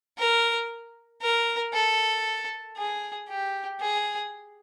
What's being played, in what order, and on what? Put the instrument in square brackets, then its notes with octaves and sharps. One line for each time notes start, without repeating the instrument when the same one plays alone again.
[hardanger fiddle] A#4
A#4
A4
G#4
G4
G#4